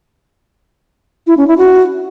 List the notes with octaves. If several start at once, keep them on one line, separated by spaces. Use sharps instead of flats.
E4
C#4
E4
F#4